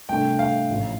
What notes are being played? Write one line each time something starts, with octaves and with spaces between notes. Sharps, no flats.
C2 C3 A3 D4 G5
F5
A1 A2 F3